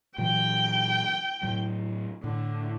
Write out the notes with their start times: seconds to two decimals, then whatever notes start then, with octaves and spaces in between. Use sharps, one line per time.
0.18 A#2 E3 F#3 G5
1.43 A2 F#3
2.24 A2 D3